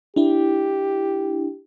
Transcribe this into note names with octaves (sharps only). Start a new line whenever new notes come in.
D4 E4 G4